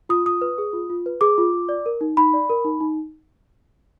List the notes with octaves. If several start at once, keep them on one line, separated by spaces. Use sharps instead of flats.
F4 D#6
F4 D#6
B4
G#4
F4
F4
B4
G#4 D6
F4
F4
D5
A#4
D#4
D#4 B5
D5
A#4
D#4
D#4